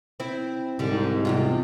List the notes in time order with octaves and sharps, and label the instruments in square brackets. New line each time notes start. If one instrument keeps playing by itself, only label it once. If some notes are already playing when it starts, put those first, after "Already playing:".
[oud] C4 E4
[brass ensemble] C2 G#2 [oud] D3 G3
[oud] E2 C3 F4